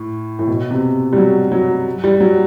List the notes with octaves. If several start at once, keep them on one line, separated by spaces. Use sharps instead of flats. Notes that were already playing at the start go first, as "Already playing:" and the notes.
Already playing: A2
A2
B2
C3
G3
F#3
F#3
G3
F#3